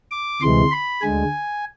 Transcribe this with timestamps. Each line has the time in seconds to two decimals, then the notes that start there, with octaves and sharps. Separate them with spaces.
0.11 D6
0.41 D2 C3 E3 G#3 C6
0.71 B5
1.01 D2 D3 G#3 G#5